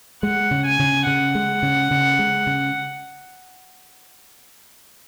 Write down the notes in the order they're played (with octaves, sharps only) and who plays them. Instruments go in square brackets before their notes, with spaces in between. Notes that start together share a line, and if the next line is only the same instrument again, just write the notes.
[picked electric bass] G#3 [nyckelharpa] F#5
[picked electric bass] C#3
[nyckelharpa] G#5
[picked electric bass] C#3
[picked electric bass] C#3 [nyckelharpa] F#5
[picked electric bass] G#3
C#3
C#3
G#3
C#3